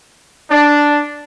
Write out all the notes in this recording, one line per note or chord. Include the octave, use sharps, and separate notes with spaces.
D4